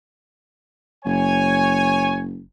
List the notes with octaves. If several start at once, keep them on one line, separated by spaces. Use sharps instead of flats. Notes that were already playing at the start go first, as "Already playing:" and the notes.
F#1 C#5 G#5